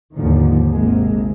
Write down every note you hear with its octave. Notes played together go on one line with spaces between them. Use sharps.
D#2 G#2 D3 D#3 F3
G#1 C3 G#3 A#3